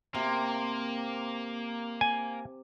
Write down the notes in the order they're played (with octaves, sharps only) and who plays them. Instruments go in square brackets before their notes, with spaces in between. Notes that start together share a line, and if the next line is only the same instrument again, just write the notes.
[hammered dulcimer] C3 [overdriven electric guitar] A#3
[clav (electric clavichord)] G#5